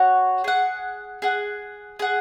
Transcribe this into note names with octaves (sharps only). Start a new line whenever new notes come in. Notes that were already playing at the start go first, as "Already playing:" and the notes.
Already playing: F#4 C#5 F#5
G#4 F#5
G#4 F#5
G#4 F#5